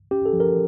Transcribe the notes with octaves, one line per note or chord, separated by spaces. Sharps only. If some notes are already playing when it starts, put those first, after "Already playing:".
C#4 G4
A4
F3
A#4